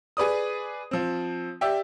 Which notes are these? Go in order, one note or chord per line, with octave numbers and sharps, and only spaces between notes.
G#4 B4 D5 D#6
F3 C4
G4 D5 E5 G5